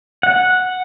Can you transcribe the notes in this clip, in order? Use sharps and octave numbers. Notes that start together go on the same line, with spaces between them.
F#5